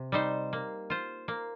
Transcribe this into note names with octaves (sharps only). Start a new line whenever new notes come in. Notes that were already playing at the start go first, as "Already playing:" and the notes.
Already playing: C3
G3 D#4 C5
A#3
F4 C5
A#3